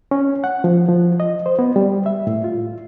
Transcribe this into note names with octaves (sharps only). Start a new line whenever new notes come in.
C#4
F#5
F3
F3
D#5
C5
B3
G3
E5
A2
F4